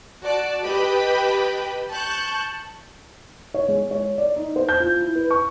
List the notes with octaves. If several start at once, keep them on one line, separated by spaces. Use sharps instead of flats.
F#4 D5 A5
G4 B4 D#5 G5 A5 B5
A5 C#6 F#6 G6
C#5
G#3
C#5
D5
D#4
C5
G6
F4
E4
B4
C#6